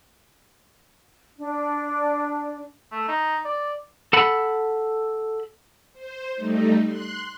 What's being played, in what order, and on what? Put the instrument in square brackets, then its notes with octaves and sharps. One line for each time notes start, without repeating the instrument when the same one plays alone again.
[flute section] D4
[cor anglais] A3
D#4
D5
[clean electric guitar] A4 F#5 B5
[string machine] C5
G3 A3 D#4
C6 F#6